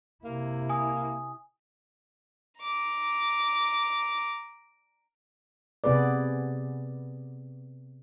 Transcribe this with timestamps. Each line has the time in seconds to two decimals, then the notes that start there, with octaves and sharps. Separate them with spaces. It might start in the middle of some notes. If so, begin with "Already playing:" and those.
0.24 C3 A#3 E4
0.70 G#5 D#6
2.61 A#5 D6
5.84 C3 B3 G#4 B4 D5